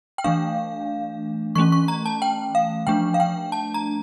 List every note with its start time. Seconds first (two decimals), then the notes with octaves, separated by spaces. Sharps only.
0.18 G5
0.24 E3 A3 D4 F5
1.55 E3 A3 C#4 C#6
1.72 C#6
1.88 A#5
2.06 A5
2.22 G5
2.55 F5
2.87 F3 A3 D4 G5
3.14 F5
3.20 G5
3.52 A5
3.74 A#5